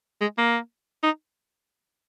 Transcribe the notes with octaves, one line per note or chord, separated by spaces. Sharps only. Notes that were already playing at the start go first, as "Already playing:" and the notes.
G#3
A#3
D#4